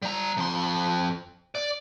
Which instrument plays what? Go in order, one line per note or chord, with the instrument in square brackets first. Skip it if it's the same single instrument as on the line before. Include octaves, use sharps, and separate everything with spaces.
[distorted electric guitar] G3 A#5
F2 C6
D5